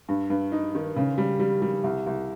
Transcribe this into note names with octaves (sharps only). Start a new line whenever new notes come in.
G2
G2
D#4
D#3
C#3
G3
G3
G3
C2
C2